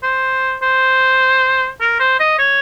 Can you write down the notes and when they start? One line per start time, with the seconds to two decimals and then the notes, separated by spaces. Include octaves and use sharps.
0.03 C5
0.62 C5
1.81 A#4
2.00 C5
2.20 D#5
2.39 C#5